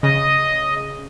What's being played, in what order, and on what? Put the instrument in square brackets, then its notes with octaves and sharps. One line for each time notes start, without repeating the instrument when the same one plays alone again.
[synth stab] C#3 [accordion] D#5